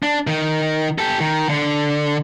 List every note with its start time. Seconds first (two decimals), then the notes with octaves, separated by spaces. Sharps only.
0.03 D4
0.27 D#3
0.98 G4 A4
1.20 D#3
1.49 D3